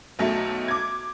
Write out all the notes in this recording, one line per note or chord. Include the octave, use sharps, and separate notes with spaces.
B1 F#3 A3
D6 G#6